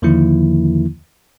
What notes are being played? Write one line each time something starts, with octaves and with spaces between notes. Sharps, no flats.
E2 D3 D#3 F3 A#3 E4